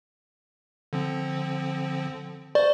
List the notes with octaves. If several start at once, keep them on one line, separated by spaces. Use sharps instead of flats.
D3 F3 C4
C5 D5 C#6 A6